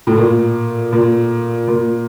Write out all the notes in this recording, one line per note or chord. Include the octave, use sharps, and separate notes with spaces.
A2
A#2
A#2
A#2